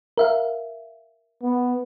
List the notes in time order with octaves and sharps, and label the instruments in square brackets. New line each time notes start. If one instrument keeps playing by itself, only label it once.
[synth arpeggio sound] A#4 E5 F5
[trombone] B3